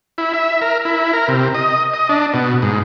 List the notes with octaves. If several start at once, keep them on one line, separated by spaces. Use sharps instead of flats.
E4
E5
A#4
E4
A#4
C3
D#5
D#5
D4
B2
G#2